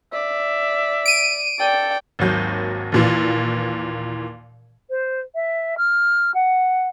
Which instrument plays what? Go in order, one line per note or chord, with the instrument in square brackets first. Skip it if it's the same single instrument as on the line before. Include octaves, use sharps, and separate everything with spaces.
[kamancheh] D5 [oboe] E5
[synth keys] D7 D#7
[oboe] A4 [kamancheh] D5 G5
[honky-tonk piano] G#1 D#2 F#3 G6
D#2 A#2 E3
[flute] C5
E5
F6
F#5